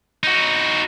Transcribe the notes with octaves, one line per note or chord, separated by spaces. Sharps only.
D#4 F#4